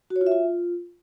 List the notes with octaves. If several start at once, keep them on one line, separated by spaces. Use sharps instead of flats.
F#4
C#5
F4
E5
F4